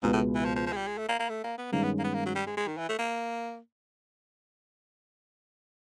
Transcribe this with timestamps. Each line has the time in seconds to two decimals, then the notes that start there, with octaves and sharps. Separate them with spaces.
0.03 C#2 G#2 B2 G#3 B3
0.13 A2
0.35 E3
0.45 F3
0.55 F3
0.66 F3
0.72 G#3
0.76 G3
0.87 G#3
0.98 A3
1.08 A#3
1.19 A#3
1.29 A3
1.44 A#3
1.58 B3
1.72 G2 D#3 G#3 A#3 C#4
1.83 B3
1.99 A#3
2.04 B3
2.14 A#3
2.25 F#3
2.35 G3
2.47 G#3
2.57 G#3
2.67 D#3
2.78 E3
2.89 A3
2.99 A#3